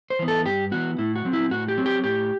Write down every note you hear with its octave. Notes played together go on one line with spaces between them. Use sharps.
C5
E3 B3
A4
G2 G4
E3 B3 F#4
A2 E4
F#4
F#3 C4
E4
A2 F#4
G4
F#3 C4
G4
A2 G4